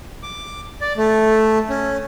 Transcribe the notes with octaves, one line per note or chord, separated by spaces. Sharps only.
D6
D5
A3
C#4